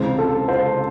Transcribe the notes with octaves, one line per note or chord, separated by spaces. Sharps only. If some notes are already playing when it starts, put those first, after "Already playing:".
Already playing: C#2 C3 E3 G#3 C5
A4
C5